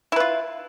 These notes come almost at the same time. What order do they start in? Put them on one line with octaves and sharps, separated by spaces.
E4 B4 F4